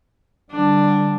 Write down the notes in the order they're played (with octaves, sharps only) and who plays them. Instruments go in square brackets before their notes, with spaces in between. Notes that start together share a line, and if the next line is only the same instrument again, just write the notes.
[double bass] D3 G3 [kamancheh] D4